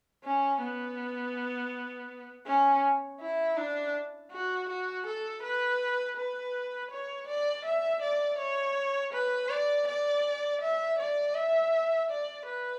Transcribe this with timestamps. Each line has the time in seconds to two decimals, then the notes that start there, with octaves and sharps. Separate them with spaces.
0.24 C#4
0.61 B3
2.46 C#4
3.20 E4
3.57 D4
4.32 F#4
4.69 F#4
5.06 A4
5.42 B4
6.17 B4
6.90 C#5
7.27 D5
7.65 E5
8.02 D5
8.38 C#5
9.12 B4
9.49 D5
9.87 D5
10.61 E5
10.98 D5
11.34 E5
12.10 D5
12.47 B4